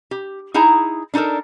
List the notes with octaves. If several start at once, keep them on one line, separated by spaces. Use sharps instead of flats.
G4
D#4 E4 G#4 G#5 A#5
D4 D#4 F#4 A4 A#4